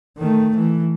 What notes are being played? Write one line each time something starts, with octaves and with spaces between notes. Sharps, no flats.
D#3 A3
E3